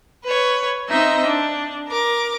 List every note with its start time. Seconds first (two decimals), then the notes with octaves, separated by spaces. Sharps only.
0.24 B4 C#5
0.87 C4 D#4 D#5 E5
1.26 D4
1.88 A#4 D6